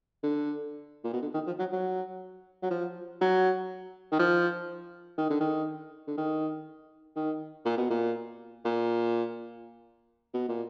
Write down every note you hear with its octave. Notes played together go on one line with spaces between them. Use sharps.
D3
A#2
B2
D3
D#3
F3
F#3
F#3
F#3
F3
F#3
D#3
F3
D#3
D3
D#3
D3
D#3
D#3
A#2
B2
A#2
A#2
B2
A#2